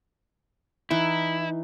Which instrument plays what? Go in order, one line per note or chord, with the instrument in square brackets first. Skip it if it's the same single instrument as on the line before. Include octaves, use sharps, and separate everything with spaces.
[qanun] E3 D#4 [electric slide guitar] E4